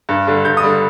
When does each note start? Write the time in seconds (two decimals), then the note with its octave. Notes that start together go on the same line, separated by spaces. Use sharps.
0.09 G2
0.27 D3 G3
0.45 G2 G6
0.57 D#6
0.63 D3 G3